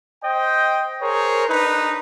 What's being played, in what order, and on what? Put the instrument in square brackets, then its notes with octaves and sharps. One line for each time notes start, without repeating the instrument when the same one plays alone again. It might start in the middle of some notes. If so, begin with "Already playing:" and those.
[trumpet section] C5 D#5 G5
G#4 A#4 C5 C#5
D4 D#4 B4